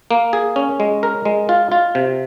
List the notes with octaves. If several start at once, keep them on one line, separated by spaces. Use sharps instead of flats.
A#3
G#4
C#4
G#3
A#4
G#3
F4
F4
C3